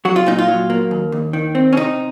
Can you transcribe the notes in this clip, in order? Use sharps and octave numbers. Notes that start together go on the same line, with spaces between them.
F#3 F#4
F4
A#2 D#4
F4
F#3
A#3
D#2
D#2
D#3
C4
C#4
C3 D#4